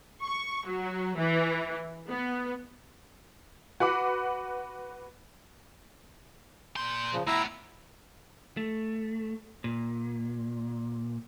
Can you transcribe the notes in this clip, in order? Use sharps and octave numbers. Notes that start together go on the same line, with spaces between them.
C#6
F#3
E3
B3
F#4 B4 F#5 B5 D6
A#2 C6 G6
C#3 F3
A2 B3 E4 A#5 E6
A3
A#2